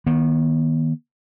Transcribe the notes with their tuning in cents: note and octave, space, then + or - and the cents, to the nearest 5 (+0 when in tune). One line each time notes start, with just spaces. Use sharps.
D#3 +5 B3 -40